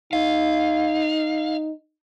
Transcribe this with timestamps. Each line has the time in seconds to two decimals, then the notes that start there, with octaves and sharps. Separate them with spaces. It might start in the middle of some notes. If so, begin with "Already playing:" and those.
0.13 D#4 F5